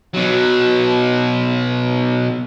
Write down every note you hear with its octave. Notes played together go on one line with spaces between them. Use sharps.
B2 F#3